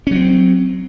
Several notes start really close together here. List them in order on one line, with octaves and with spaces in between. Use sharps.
C#4 F#3 C4